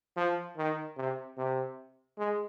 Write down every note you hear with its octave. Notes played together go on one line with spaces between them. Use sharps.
F3
D#3
C3
C3
G#3